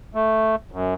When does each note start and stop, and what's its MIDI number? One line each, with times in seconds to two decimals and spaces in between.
0.15 0.55 57
0.72 0.94 42